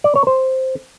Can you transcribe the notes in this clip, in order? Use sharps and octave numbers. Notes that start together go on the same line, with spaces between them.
D5
C#5
C5